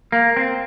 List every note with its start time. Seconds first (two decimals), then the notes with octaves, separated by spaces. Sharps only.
0.12 A#3
0.37 C4